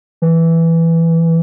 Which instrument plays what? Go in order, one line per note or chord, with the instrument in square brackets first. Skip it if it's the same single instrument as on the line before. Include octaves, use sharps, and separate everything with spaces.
[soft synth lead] E3